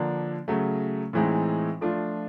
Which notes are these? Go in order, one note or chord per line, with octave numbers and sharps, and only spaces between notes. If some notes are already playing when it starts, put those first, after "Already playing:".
Already playing: D3 F3 A#3 D4
C#3 F#3 A3
A2 E3 G#3 C4 D#4
F3 A3 D4 F4